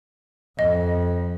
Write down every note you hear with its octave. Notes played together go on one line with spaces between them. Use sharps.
F2 D#5